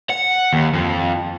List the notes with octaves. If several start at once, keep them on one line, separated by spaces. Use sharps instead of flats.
F#5
D#2
F2